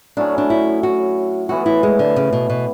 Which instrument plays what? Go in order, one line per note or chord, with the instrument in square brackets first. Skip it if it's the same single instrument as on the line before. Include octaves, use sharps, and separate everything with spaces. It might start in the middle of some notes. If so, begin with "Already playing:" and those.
[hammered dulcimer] A2 F#3 C#4 [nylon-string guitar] D4
[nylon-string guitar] D4
E4
F#4
[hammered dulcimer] A2 E3 B3 [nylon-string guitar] F#4
[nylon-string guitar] E4
G#3
D3
C#3
B2
B2